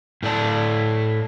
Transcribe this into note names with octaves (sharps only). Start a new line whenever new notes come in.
A2 A3 D5 A5